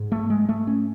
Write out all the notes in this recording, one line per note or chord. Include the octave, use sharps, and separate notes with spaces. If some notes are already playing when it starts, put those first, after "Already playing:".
Already playing: G#2
A3
G#3
A3
C#4